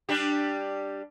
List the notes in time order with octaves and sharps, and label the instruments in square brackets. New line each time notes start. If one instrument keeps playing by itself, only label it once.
[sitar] G3 D4 G4